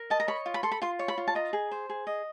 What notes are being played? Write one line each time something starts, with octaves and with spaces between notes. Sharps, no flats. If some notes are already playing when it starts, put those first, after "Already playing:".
Already playing: A#4
D#5 A5
A#5
C#5 B5
F4
B5
A4 C6
B5
F4 C6
C#5
B5
F4
A5
D#5 A#5
G#4
C5
G#4
D#5